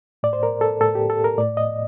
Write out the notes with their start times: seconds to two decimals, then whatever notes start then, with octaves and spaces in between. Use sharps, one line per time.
0.23 A2 D5
0.33 C5
0.43 A#4
0.61 A4
0.80 A2 A4
0.95 G4
1.10 A4
1.24 A#4
1.38 A2 D5
1.57 D#5